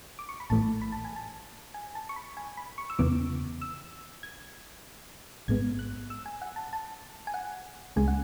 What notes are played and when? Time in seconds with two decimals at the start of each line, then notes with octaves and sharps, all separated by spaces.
0.19 D6
0.29 C#6
0.40 B5
0.50 A1 A2 E3 A3 A5
0.82 B5
0.92 A5
1.05 G#5
1.16 A5
1.74 G#5
1.95 A5
2.09 C#6
2.16 B5
2.37 G#5
2.57 B5
2.78 C#6
2.90 E6
2.99 E2 C#3 E3 B3 D6
3.62 E6
4.23 G#6
5.48 A1 G#2 G#3 B3 G#6
5.79 F#6
6.10 E6
6.26 G#5
6.42 F#5
6.56 A5
6.73 A5
7.27 G#5
7.34 F#5
7.96 C#2 C#3 G#3 G#5
8.08 F#5